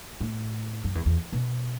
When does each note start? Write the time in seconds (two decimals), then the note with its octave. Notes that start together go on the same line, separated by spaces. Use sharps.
0.21 A2
0.84 F#2
0.95 E2
1.06 E2
1.32 B2